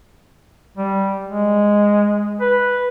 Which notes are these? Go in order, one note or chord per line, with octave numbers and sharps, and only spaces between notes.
G3
G#3
B4